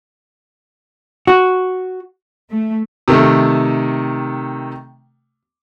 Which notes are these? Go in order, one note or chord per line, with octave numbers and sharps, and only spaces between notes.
F#4
A3
C3 D#3 A3